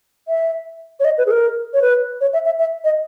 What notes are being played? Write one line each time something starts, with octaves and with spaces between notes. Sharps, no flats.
E5
C#5
D#5
B4
G#4
A#4
C#5
B4
C#5
E5
E5
E5
D#5